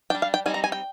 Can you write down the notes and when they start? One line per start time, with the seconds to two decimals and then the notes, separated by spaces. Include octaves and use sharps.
0.10 G3 D4 G5
0.22 F5
0.34 G5
0.46 G3 C4 D#4 G#5
0.54 A#5
0.64 G#5
0.72 G5